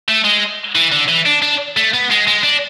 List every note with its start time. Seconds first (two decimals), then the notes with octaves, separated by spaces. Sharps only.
0.09 A3
0.24 G#3
0.76 E3
0.92 D3
1.09 E3
1.26 D4
1.42 D4
1.77 A3
1.94 B3
2.11 G#3
2.28 G#3
2.44 D4